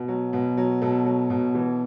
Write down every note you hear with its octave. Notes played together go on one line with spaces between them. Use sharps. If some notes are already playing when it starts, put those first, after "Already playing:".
Already playing: B2
F#3
B2
F#3
B2 A4
F#3
B2
E3